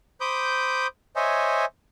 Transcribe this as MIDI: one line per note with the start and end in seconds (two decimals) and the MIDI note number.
0.21 0.87 72
0.21 0.87 83
0.21 0.87 86
0.21 0.87 87
0.21 0.87 91
1.16 1.65 72
1.16 1.65 73
1.16 1.65 75
1.16 1.65 76
1.16 1.65 80